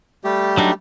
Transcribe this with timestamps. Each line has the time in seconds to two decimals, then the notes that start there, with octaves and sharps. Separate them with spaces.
0.24 G3 A3 G4
0.57 F#3 D4 D#4